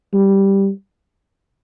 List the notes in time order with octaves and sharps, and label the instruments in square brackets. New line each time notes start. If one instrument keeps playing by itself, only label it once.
[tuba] G3